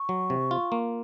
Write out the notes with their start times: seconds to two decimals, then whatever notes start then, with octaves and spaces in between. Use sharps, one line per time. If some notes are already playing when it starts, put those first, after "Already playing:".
Already playing: C#6
0.09 F#3
0.30 C3
0.51 F4
0.72 A#3